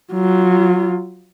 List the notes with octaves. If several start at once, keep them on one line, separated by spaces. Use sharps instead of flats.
F#3 F4